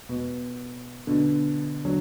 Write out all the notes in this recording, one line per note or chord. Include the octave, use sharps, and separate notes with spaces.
B2
B2 D3
D3 F#3